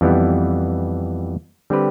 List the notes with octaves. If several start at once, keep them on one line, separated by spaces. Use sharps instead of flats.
F2 E3 G3 B3
D3 G3 C4 G4 B4